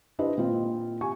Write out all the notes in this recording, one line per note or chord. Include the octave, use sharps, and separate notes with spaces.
D4 E4 G4 B4 C5 D#5
A#2 C4 F4
G4 G#5 C#6